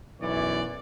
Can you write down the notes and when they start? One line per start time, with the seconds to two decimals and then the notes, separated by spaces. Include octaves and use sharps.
0.21 B1 F#2 E3 E4 C#5 D5